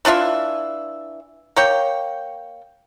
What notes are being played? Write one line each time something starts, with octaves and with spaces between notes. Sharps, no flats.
E3 D4 F4 E5
A#3 C#5 G5